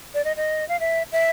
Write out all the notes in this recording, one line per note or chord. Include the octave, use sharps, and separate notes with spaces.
D5
D#5
D#5
F5
E5
E5